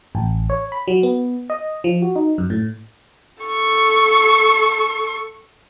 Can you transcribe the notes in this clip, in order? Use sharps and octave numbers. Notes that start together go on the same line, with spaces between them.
A1
C#5
B5
F#3
B3
D#5
F3
F#4
D#4
F#2
A2
A4 C#6